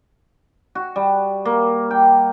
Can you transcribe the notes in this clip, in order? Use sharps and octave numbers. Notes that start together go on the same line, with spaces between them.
F#4
G3
A#3
G5